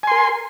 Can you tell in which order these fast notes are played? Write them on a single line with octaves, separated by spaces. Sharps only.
G#5 C6 A#4